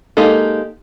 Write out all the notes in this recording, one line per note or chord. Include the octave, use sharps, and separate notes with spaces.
G#3 A#3 D#4 G4 A4